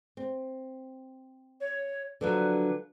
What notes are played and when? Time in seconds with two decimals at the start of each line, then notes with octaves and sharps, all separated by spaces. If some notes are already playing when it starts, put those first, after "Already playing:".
0.17 C4
1.60 C#5
2.21 D3 F3 F#3 B4